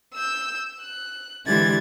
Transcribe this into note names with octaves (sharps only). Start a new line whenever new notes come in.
E6 G6
F#6
D3 E3 G#3 G4 G#6 A6